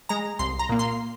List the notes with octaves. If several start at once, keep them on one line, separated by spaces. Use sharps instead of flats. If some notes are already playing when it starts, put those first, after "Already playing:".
G#3 A#5
C2 C6
A#5
A#2 A#3
C6